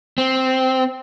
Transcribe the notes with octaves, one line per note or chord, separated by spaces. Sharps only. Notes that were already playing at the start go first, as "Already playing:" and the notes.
C4